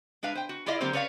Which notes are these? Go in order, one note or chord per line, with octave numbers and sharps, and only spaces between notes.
G#3 D4 B4 F5
C5 G5
F#4
E4 F4 G#4 D5 D#5 F5
D3 F#3 A#3 C4 G4 C5
C#4 B4 C#5 D5 E5 F5